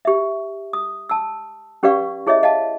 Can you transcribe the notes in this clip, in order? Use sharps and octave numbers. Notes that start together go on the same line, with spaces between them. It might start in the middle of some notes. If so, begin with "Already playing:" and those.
G4 E5
D#6
A5 E6
C#4 G4 B4 D5 F5 C#6
E4 G#4 C#5 D#5 E5
D#5 F5 A5